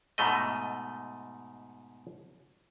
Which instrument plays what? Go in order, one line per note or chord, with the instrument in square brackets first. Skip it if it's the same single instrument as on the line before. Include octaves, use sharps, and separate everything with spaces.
[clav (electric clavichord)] G#2 B2 A3 D#5